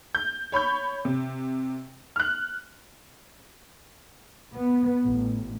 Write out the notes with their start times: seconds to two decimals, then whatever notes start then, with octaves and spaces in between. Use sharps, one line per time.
0.15 G6
0.52 C#5 B5 C#6 G6
1.05 C3
2.16 F6 F#6
4.58 B3
5.06 A1